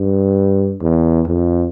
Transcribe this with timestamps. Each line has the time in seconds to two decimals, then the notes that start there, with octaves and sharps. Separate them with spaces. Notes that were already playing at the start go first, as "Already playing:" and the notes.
Already playing: G2
0.82 E2
1.27 F2